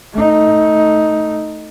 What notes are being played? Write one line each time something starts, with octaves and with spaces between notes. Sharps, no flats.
A3 D#4